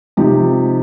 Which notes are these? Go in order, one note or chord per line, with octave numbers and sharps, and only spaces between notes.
C3 F3 D#4 G4